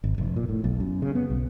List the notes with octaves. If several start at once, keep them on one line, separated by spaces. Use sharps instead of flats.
G#1
F1
A#2
A2
B1
F#2
C#3
B3
B1